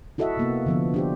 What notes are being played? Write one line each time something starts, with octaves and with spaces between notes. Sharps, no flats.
E4 F#4 A4 D#5 E5 F#5
C3 A#3 B3
D3 F3 B3
D4 G4 C5